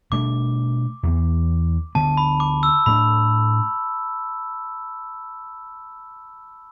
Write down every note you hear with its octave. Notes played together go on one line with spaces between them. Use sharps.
B2 A3 D4 D6
E2 E3 B3
D2 D3 B3 A5
B5
D6
E6
A2 A3 D4 B5